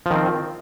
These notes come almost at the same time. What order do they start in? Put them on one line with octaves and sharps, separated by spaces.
F3 D#3 C4